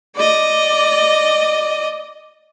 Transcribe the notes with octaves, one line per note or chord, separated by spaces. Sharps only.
D5 D#5